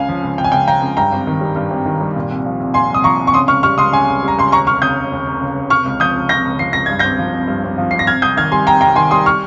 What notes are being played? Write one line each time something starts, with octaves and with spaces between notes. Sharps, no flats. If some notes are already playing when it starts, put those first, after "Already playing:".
Already playing: C#2 C#3 F5 G#5
F3
C#2
C#3 G5
G#5
C#2 G5
F3 G5 A#5
C#2
G2 G5 A#5
G#1
D#3
G3
G2
G#1
D#3
G3
A#2
C2
F3
C2
A#2 G#5 C6
C2 D#6
F3 A#5 C#6
C2
C#6
C#3 C6 D#6
C#2 C#6 F6
G3 C#6 F6
C#2 C6 D#6
C#3 G#5 C6
C#2
G3
A#5
C#2 C6
D#2 A#5 C#6
F1 C#6 F6
C#3 D#6 G6
F1
D#2
F1
C#3
F1
C3 C#6 F6
C#2
F3 D#6 G6
C#2
C3 G6 A#6
C#2
F3 C7
C#2 A#6
G2 G#6
G#1 G6 A#6
F3
G#1
G2
G#1
F3
G#1 C7
A#6
C3 F6 G#6
C2 D#6 G6
D#3 F6 G#6
G3 G#5 C6
C3 G5 A#5
C2 G5 A#5
D#3 G#5 C6
G3 C6 D#6
C#6 F6